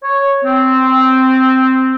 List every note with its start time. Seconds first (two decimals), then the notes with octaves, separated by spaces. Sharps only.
0.03 C#5
0.44 C4